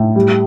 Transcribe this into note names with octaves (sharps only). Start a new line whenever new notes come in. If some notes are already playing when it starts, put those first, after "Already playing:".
Already playing: A2
G3